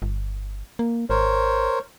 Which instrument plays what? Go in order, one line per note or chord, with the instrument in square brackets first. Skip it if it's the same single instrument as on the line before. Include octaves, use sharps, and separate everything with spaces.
[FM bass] G1
A#3
[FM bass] G#1 [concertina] A#4 C5 C#5